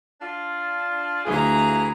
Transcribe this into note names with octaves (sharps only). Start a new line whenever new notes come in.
D4 F4
D2 E3 F4 G#4 A#5